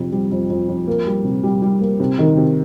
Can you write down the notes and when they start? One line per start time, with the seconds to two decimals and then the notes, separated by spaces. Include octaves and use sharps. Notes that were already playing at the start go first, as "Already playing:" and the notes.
Already playing: F2 C3
0.12 G3
0.31 F2
0.50 F2
0.68 F2
0.87 A#3
1.06 G3
1.24 C3
1.43 G3
1.62 G3
1.81 A#3
2.00 C3
2.19 D#3
2.37 C3